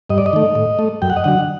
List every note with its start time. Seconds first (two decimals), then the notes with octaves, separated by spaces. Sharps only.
0.10 G2 D#5
0.18 D5
0.26 D#5
0.33 D#3 A3
0.55 A2
0.79 A3
1.02 F#2 G5
1.10 F#5
1.16 D#5
1.24 D3 F#3 F#5